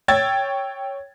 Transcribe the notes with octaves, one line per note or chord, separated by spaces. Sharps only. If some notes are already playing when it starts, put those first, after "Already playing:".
C#5 G5 E6 G#6 A6